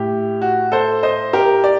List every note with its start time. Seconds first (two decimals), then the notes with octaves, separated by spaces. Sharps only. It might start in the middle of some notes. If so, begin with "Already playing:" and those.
Already playing: A2 G4
0.42 F#4
0.72 A4 C5
1.03 C5 D#5
1.33 G4 A#4
1.64 D5